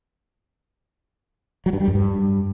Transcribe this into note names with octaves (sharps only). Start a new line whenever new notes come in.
F#3
G2
G3
F#2
G2